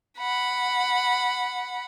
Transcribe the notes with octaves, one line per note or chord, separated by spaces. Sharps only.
F#5 B5